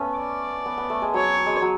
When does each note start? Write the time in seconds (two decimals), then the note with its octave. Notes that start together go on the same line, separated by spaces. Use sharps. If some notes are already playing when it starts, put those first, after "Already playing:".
Already playing: A3 B3 C#4
0.17 D5
0.66 B3
0.78 B3
0.90 A3
1.02 G#3
1.14 F#3 C#5
1.46 G#3
1.62 F#3